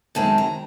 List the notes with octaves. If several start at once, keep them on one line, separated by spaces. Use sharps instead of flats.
F#2 D#3 G#3 C4 A5
A#5